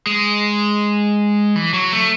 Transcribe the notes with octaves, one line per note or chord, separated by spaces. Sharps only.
G#3
E3
F#3
A3